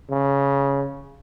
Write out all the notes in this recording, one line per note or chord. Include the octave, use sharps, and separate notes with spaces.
C#3